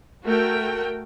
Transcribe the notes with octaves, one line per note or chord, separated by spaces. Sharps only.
A3 F#4 A#4 G5